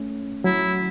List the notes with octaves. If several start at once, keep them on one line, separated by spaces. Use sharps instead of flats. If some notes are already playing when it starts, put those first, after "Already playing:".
Already playing: A3 C#4
F#3 E4